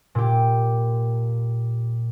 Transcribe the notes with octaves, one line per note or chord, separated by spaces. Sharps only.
A#2 G4